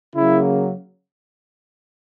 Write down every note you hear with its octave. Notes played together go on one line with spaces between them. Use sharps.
C#3 F#3 A#3 E4